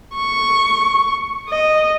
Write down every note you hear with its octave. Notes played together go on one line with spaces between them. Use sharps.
C#6
D#5